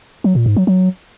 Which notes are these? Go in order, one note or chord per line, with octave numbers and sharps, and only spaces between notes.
F#3
A#2
G#2
F#3
F#3